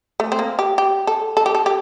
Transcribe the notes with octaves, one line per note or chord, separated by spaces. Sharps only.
A3
C4
A#3
G4
G4
A4
A4
G4
A4
G4